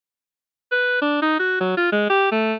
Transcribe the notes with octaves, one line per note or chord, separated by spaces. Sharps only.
B4
D4
D#4
F#4
F#3
F4
G#3
G4
A3